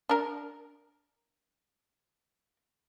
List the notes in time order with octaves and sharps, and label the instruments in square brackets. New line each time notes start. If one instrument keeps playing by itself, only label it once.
[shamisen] D4 A#4